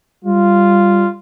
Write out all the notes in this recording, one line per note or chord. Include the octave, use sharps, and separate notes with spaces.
G3 F4